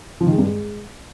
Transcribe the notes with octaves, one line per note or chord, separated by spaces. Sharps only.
F3
D#3
G#3
G2
G#3